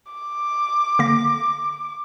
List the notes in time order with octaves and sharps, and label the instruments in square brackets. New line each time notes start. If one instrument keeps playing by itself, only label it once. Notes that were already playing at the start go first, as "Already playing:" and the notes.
[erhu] D6
[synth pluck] D3 A#3 A#6